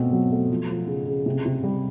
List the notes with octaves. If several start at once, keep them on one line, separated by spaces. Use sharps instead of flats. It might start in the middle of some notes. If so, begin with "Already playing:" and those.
Already playing: B2 A3 C4
F#3
A3
F3
F3
C#3
C#3
C3
C3
G3